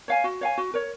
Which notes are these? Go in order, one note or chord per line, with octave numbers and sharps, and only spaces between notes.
C#5 F5 G#5
F#4
C#5 F5 G#5
F#4
A#4 C#5